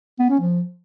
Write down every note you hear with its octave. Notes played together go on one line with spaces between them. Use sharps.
B3
C#4
F3